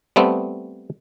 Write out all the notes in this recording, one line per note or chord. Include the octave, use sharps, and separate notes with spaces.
G3 A3 B3 C4